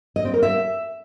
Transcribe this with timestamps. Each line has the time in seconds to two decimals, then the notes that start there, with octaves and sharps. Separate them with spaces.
0.16 D#5
0.25 C4
0.34 A#4
0.43 E5